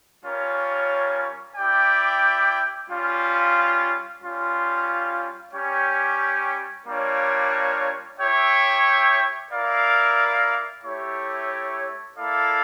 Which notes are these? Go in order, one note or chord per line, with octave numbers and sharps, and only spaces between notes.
G3 C#4 F4 A#4 C#5
E4 G4 D5 G5
G3 C#4 F4
G3 C#4 F4
G3 C#4 G4 C#5 G5
G3 A#3 D4 F4 C#5
E4 G4 C#5 E5 G5
E4 A#4 D5 F5
A3 E4 G4 C#5
A#3 E4 A4 D5 F5